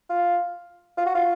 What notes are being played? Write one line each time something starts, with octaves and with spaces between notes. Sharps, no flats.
F4
F4
F#4
F4